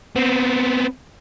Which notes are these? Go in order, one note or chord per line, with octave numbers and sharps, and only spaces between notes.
B3 C4